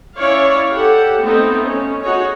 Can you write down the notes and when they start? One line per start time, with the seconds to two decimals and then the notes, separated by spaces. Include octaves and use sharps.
0.16 C#4 E4 C#5 D5 F5
0.72 G4 A4 F#5
1.21 A3 B3 C4 D#4
1.63 C#4
2.02 D#4 F#4 G#4 C#5